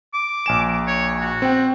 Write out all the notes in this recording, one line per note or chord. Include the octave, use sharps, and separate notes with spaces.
D6
A#1 G#5 E7
C#5
F#4
C4 G5